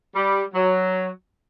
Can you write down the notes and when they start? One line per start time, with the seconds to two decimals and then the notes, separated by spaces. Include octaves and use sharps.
0.16 G3
0.54 F#3